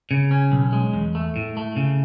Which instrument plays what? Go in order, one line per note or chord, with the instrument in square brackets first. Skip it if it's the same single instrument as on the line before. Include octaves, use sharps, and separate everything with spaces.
[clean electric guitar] C#3
C#4
B1
G#3
E2
A3
A2
A3
C#3